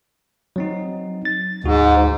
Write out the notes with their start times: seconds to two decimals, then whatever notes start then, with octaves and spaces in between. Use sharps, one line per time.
0.56 F#3 C4 D#4
1.25 A6
1.64 D2 G#2 F#4